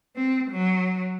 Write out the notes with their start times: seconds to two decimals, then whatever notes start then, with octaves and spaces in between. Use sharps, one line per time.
0.16 C4
0.51 F#3